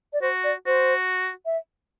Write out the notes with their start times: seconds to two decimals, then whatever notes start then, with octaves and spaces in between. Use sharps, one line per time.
0.13 D5
0.21 F#4 C5
0.44 D5
0.66 F#4 C5
1.46 E5